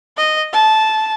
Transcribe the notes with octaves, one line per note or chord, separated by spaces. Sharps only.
D#5
A5